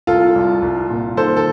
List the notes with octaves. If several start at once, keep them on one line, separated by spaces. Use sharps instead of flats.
C2 F4 A4
C2
C2
A#2
D#3 A4 C5
A4